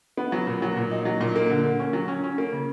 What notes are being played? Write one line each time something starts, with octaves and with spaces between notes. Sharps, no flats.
B3
F#3
A#2
F#3
A#2
D#4
F#3
A#2
A#3
D3
A#3
C#4
F#3
C#4
C#4
A#3
C#3